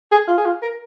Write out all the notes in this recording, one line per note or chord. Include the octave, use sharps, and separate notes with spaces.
G#4
F4
G#4
F4
A#4